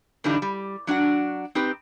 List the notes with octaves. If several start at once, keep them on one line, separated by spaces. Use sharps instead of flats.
G2 D3 E3 G3 D4 D#4
G3
F#3 D4 F#4 F#5
C4 D#4 G4 B4